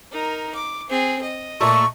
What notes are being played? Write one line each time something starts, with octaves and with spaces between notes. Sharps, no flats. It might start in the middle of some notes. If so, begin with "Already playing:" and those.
D#4 A#4
D6
C4 G#4
D#5
A#2 A3 A4 C#6